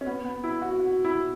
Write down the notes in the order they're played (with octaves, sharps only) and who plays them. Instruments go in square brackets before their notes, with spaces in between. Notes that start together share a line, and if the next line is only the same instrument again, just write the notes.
[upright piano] C#4
B3
B3
E4
F#4
F#4
E4